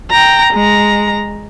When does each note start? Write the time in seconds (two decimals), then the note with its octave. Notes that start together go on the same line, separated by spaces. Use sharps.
0.10 G5 A#5
0.53 G#3 A#5